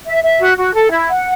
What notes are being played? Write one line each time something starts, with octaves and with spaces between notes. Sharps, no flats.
E5
E5
F#4
F#4
A4
E4
F#5